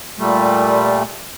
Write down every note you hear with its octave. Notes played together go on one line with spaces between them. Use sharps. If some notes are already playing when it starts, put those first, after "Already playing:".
A#2 G3 A3